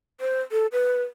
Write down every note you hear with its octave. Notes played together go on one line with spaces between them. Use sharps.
C5
A4
B4